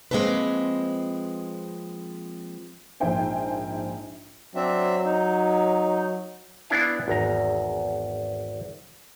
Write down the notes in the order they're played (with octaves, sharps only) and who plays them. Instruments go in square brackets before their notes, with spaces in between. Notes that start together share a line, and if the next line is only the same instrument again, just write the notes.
[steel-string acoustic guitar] F3 G#3 A#3 C4 D4 B4
[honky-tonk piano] A#1 G#2 C5 E5 G5 G#5
[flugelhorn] F#3 [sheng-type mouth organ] C4 D4 E5
[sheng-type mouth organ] D#4
[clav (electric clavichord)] B3 D4 E4 F5 G#5
G#1 E2 A#5